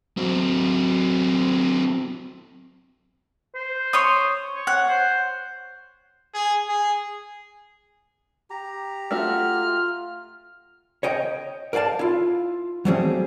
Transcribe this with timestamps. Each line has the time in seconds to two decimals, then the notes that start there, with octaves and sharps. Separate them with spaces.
0.17 F#3 C4
3.55 C5
3.93 C#5 C6 D#6
4.56 C#5
4.67 F#5
4.89 C5
6.34 G#4
6.69 G#4
8.50 G4 A#5
9.11 A3 F4 F#4 F6
11.03 C#5 D#5 G5
11.73 A#4 D5 F5 G5 A5
11.99 E4 F4
12.85 F#3 G3 A3 C4 C#4 G#4